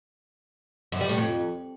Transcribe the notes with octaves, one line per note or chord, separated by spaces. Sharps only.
F#2
G3
A2
F2